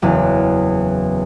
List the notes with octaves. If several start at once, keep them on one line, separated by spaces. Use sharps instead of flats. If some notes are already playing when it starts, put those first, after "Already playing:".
F#1 E2